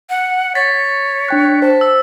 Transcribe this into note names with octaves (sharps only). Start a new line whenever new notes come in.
F#5
C#5 A6 B6
D4 G5 F#6
C5 A5
E6